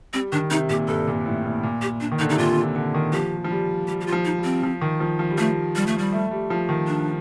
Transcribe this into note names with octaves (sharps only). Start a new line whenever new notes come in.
G3 C4
D#3 D4
C3 D#4
A#2 G4
G2 A4
A#2
A2
A#2
A#2
G4
D4
D#3
D3 D#4
C3 D#4
A#2 F4
C3
D3
D#3
F3 G4
F3
G3
G3 G4
G4
F4
F3
D#4
G3
C4
F3
D#3
F3
F3
G3
F3 A3
G3
A3
G3
A3
G3
F3
D#3
D4